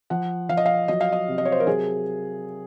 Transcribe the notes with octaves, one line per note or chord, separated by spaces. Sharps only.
F3 F#5
F3 F5
D#5
F5
F#3 D#5
F5
D#5
C3
D#5
C#5
C5
A#4
F#3 G#4